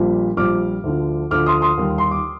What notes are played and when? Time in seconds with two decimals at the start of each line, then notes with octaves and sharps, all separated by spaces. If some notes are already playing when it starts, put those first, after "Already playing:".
Already playing: A#1 A#2 G3
0.37 A#1 A#2 G3 D6 F6
0.83 D2 D3 F3
1.31 D2 D3 F3 D6 F6
1.46 C6 D#6
1.62 C6 D#6
1.77 D#2 D#3 G3
1.98 C6
2.11 D6